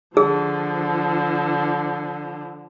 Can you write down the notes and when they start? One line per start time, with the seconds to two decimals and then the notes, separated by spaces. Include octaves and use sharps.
0.17 D3 F3 G#4